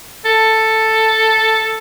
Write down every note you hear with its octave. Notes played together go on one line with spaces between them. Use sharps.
A4